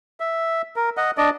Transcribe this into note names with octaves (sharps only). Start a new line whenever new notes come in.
E5
A#4
D#5 F#5
D4 D5 D#5